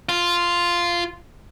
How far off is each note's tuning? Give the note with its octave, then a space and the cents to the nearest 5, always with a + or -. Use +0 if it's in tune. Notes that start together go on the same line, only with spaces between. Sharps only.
F4 -5